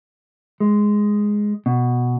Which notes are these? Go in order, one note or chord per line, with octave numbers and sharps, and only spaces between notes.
G#3
B2